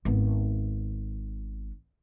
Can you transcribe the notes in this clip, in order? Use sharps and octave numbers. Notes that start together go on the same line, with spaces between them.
G#1 B3